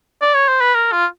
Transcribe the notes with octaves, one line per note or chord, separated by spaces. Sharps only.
D5
C#5
C5
B4
A#4
F4